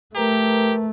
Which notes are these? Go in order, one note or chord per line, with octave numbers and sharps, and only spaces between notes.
A3 G4 A#4 B4 A#5